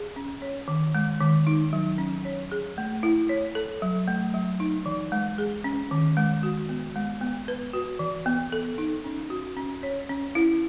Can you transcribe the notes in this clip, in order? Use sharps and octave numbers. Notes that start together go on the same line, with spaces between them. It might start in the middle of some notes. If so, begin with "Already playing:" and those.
Already playing: G#4
C#4
C#5
D#3
G#3
D#3
D#4
F#3
C#4
C#5
G#4
A3
E4
C#5
A4
F#3
A3
F#3
D#4
E3
G#3
G#4
C#4
D#3
G#3
F#4
B3
G#3
B3
B4
F#4
E3
B3
A4
D#4
C#4
F#4
C#4
C#5
C#4
E4